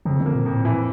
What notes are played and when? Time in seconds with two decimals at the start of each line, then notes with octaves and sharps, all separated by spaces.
0.05 F2 C#3
0.20 D3
0.26 A#3
0.35 A#2
0.46 F2
0.51 A2
0.65 A#2 E3